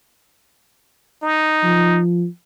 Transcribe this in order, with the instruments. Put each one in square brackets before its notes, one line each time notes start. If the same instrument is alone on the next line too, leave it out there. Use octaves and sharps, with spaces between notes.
[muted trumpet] D#4
[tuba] F3